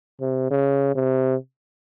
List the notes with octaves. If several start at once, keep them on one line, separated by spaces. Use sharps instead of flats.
C3
C#3
C3